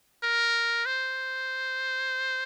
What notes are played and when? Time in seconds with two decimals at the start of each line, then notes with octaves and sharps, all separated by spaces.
0.23 A#4
0.86 C5